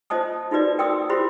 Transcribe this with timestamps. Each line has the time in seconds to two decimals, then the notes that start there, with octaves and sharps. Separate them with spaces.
0.10 F4 C5 D#5 A5 D#6
0.51 D#4 F4 F#4 B4 D5
0.79 A#4 G5 C6 D#6 E6
1.09 E4 F4 G4 C5 B5 C6